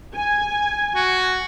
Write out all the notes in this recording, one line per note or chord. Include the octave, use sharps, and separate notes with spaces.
G#5
F#4